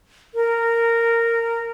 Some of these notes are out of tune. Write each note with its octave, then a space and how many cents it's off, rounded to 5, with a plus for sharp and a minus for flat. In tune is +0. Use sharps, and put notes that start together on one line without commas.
A#4 -10